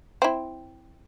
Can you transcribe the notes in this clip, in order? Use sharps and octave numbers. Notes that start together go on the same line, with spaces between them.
C4 E4